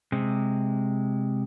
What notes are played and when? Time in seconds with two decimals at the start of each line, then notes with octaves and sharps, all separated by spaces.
0.12 C3 G#3